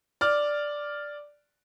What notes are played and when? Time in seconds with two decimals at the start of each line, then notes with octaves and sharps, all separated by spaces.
0.21 D5 F6